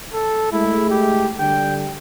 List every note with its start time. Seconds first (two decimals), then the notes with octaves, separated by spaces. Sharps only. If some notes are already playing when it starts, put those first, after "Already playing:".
0.13 A4
0.52 G#3 A3 E4
0.90 G4
1.39 D3 G3 G5